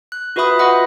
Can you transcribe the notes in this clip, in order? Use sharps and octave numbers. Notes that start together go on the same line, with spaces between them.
F#6
F4 F#4 B4 E5 B5 D#6
F4 F#4 B4 D#5 F#5 B5